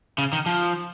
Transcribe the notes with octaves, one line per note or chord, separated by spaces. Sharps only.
C#3
D#3
F3